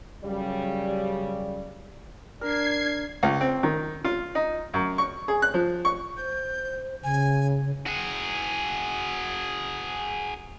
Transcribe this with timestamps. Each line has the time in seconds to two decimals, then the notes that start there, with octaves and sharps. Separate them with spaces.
0.24 F#2 C#3 G3
2.41 D4 A#4 G#6 C7
3.23 C#2
3.41 C4
3.63 D#3
4.04 F4
4.35 D#4
4.74 F#2
4.98 C#6
5.28 G#4
5.42 F#6
5.54 F3
5.85 C#6
6.17 C5 G6
7.04 C#3 G#5
7.87 F#4 G#4